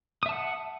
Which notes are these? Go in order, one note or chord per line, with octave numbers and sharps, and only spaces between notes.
E5 F#5 A5 D#6